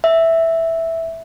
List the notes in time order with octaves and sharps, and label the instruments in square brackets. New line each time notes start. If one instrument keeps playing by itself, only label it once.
[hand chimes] E5